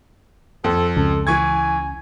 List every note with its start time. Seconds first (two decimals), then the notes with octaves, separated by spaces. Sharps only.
0.64 F2 A4
0.97 C#2 C#3 A4
1.27 E3 G#5 C#6 G#6